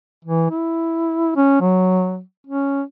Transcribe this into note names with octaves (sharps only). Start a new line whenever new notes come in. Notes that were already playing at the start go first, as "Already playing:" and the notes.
E3
E4
C#4
F#3
C#4